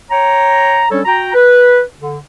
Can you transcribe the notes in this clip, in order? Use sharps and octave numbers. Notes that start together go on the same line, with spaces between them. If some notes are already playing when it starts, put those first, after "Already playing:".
C#5 G5 A#5
G3 C#4 D4 A4 C#5
F#4 G5 A#5
B4
D3